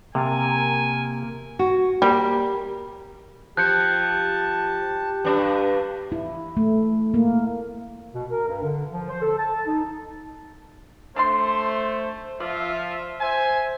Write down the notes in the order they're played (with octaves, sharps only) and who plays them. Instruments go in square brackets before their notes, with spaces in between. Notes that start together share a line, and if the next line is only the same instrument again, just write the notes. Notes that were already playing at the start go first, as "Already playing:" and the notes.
[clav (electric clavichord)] C3 [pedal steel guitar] A#3 A#4 A5 [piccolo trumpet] G#5
[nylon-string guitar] F#4
[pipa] G3 [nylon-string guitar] A#3 G4
[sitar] F3 [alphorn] G4 [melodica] A5 [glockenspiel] F#6 G6 C#7
[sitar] G2 D4
[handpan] E4
A3
A#3
[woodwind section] B2
A#4
G2
D3
F3
C5
A4
A5
D#4
[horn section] A3 C5 [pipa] D4 D5 C6
[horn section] F3 F4 E5 [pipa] D5
[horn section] C5 E5 G#5